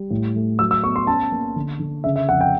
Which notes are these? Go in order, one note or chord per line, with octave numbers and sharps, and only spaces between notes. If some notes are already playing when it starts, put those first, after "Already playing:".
Already playing: G3
A2
A3
F#3 E6
E6
B3 C#6
C6
C#4 A5
A#3
D3
D3
C#3 E5
E5
F2 F#5
G5